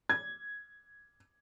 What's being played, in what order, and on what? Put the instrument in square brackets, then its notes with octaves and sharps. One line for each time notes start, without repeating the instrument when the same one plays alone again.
[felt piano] G#6